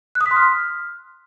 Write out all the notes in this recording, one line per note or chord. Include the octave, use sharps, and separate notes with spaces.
F#6
D#6
B6
C6
F6